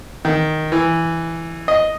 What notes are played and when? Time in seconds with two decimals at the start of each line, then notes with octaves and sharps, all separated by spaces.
0.25 D#3
0.72 E3
1.68 D#5